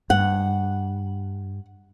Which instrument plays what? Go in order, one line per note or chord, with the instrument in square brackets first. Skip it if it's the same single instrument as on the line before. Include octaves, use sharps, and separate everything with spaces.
[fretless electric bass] G2 [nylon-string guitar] F#5